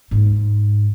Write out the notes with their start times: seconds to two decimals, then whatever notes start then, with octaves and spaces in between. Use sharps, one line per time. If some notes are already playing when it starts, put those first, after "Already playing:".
0.11 G#2